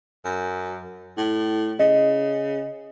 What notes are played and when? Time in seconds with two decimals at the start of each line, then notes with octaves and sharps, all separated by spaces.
0.25 F#2
1.17 A2
1.79 C#3 D#5